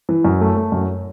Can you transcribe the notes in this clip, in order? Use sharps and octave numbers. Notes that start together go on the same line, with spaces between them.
E3
F#2
A3
A3
F#2